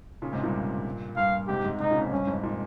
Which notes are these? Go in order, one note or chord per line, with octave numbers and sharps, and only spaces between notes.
A#2 C#3
G#2 C3
G2 A#2
G2 A#2 F5
G#2 C3 G4
G#2 C3
G#2 C3 D#4
A#2 C#3
F2
G2 C#4
F2 G#2
A#2